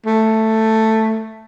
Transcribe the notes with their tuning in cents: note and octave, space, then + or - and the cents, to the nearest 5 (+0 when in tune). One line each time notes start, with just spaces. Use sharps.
A3 +5